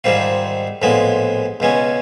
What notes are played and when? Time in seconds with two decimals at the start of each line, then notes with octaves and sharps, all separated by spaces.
0.04 G#2 D#3 G3 C4 F4
0.82 A#1 A2 F3 G#3 B3
1.60 C#2 B2 G#3 C#4